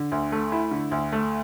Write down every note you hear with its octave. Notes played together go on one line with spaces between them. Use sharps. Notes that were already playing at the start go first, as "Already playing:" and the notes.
Already playing: D3
D2
A3
E4
D3
D2
A3